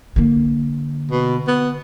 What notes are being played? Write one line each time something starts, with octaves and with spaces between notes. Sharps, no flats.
D3 A#3
B2
B3